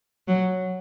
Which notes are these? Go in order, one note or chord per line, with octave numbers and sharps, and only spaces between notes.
F#3